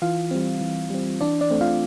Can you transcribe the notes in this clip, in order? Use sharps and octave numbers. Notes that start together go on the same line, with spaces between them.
E3 F4 F5
G3 C4
E3
G3 C4
E3 D4 D5
D4 D5
A3 C4
F4 F5